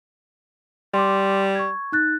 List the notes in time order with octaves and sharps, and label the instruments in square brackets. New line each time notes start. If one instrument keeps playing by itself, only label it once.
[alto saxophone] G3 [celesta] C6 D6
[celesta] C#6 G#6
D#4 F#6 A6